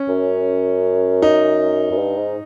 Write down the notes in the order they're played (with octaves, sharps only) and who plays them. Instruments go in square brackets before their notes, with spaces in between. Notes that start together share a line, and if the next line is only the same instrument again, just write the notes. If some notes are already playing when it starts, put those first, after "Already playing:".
Already playing: [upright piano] C#4
[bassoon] F#2
[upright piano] D#4
[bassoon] F#2
G2
G#2